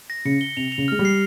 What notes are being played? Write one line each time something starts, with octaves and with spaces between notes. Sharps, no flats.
A#6
C#3 C#7
G7
C3 F7
F7
C#3
G#3 F6
G3
C7